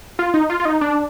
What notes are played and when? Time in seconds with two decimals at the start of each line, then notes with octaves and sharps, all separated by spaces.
0.19 F4
0.34 D#4
0.50 F4
0.60 F4
0.65 D#4
0.81 D4